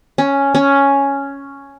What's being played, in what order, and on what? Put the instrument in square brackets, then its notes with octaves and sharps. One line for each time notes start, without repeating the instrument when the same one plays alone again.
[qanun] C#4
C#4